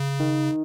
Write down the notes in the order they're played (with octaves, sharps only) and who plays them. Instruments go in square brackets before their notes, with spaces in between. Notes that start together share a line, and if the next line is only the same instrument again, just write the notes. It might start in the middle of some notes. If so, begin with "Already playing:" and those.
Already playing: [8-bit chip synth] C#3
[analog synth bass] D#3